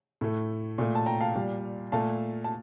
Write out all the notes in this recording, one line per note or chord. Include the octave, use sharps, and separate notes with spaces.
A2 A3
A#2 A3
A5
G5 A#5
F5 A5
A#2 G3
A#2 A3 F5 A5
A5